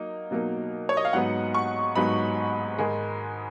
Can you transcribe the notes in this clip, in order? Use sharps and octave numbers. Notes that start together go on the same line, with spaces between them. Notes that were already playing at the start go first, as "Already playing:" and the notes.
Already playing: F#3 A#3 D#4
B2 F#3 A#3 D#4
C#5
D#5
F5
G#2 F#3 B3 D#4 F#5
C#6
G#2 F#3 B3 D#4 B5
G#2 D#3 G#3